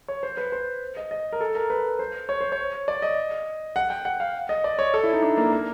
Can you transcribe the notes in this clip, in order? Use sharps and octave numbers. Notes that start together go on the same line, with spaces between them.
C#5
C5
B4
C5
D#5
D#5
A#4
A4
A#4
B4
C5
C#5
C5
C#5
D5
D#5
F#5
G5
F#5
F5
D#5
D5
C#5
A4
E4
D#4
D4
A#3
A#3